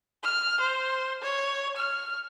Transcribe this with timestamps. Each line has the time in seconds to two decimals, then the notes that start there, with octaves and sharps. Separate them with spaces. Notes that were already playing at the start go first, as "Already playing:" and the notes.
0.23 F6
0.60 C5
1.22 C#5
1.77 F6